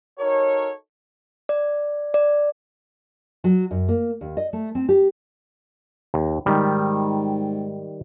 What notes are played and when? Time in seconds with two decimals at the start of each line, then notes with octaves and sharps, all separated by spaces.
0.19 D#4 F#4 A4 A#4 C#5
1.49 D5
2.14 D5
3.44 F#3
3.71 F#2
3.88 A#3
4.21 D#2
4.37 D#5
4.53 A3
4.75 C4
4.89 G4
6.14 D#2
6.46 G#2 D#3 G3